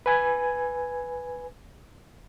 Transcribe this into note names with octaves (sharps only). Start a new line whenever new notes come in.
B4 G#5 G#6